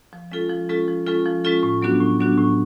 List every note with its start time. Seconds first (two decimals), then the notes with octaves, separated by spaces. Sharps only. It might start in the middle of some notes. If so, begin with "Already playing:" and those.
0.13 F3
0.31 G#3 C#4 F4 A4
0.50 F3
0.69 G#3 C#4 F4 A4
0.88 F3
1.07 G#3 C#4 F4 A4
1.26 F3
1.44 G#3 C#4 F4 A4
1.63 A2
1.82 F#3 B3 D4 F#4
2.00 A2
2.19 F#3 B3 D4 F#4
2.38 A2